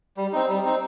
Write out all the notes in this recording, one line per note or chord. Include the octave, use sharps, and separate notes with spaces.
G3
C4 D#4
G3
C4 D#4